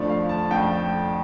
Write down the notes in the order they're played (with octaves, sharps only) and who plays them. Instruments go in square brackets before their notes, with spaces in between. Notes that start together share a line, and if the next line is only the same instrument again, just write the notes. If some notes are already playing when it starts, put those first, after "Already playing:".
Already playing: [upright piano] F2 F3 A3 D4
F5
A5
F2 F3 A3 D4 G5